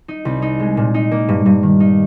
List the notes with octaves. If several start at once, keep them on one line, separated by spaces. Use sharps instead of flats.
D#4
C2
D#4
G#3
A#2
D#4
A#3
G2
G2
D#3
D#4